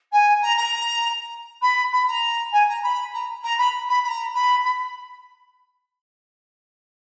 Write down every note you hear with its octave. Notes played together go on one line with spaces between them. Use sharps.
G#5
A#5
A#5
B5
B5
A#5
G#5
A#5
B5
A#5
A#5
B5
B5
B5
A#5
B5
B5